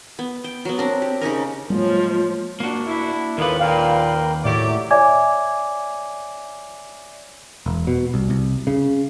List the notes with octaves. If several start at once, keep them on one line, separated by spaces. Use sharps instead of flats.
B3
G5
F#3 B3
C4 D4 A#4
G4
C#3 C#4 D#4 A#4
E2 A2 F3 F#3 G#3 A#3
A#3 D4 F#4
E4
D#2 A2 D3 A#3 B3 F4 B4
A#2 A#4 F5 G5
A2 F#3 G4 C#5 D5 E5
C#5 D5 E5 G#5 D6 G#6
E1
B2
C2
C2
C#3